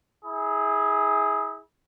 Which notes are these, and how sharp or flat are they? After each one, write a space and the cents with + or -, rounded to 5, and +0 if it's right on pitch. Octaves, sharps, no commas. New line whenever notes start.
E4 -35 G#4 +0